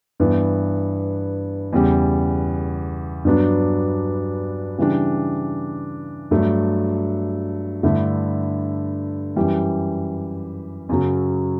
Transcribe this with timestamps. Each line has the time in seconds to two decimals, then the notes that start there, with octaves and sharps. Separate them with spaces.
0.20 G2 E3 B3
1.72 E2 C#3 G3
3.25 G2 F#3 B3 D4
4.78 C#3 E3 G3 D4
6.31 G2 F#3 A3
7.83 G2 D3 A3 E4
9.36 F#2 E3 G3
10.89 F#2 C#3 F#3